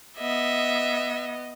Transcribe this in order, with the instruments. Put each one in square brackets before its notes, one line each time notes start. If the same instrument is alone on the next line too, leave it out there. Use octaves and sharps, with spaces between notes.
[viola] B3 D#5 [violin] E5